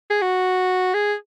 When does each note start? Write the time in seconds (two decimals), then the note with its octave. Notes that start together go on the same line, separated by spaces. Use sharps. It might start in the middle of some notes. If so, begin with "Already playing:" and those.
0.10 G#4
0.21 F#4
0.94 G#4